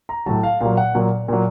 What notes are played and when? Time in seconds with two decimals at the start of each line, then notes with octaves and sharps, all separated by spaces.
0.09 A#5
0.26 A2 F#3 A5
0.43 F5
0.60 A#2 F#3 F5
0.77 F#5
0.95 A#2 F#3
1.28 A#2 F#3